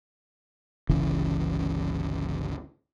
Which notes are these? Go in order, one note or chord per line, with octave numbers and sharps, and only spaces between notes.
G1 C#2 C#3 E3